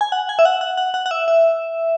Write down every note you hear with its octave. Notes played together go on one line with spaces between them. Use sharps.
G#5
F#5
G#5
E5
F#5
F#5
F#5
F#5
F#5
E5
E5